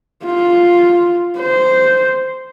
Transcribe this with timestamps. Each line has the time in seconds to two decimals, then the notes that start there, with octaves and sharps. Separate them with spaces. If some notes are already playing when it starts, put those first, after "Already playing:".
0.25 F4
1.39 C5